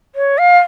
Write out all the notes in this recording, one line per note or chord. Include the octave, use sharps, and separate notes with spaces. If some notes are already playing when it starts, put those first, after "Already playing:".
C#5
F5